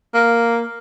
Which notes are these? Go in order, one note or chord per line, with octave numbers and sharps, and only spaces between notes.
A#3